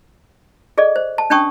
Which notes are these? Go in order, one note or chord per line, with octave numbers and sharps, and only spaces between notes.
G#4 A4 D5 D#5
C5
A5
C#4 D4 G5 A5 C#6 D#6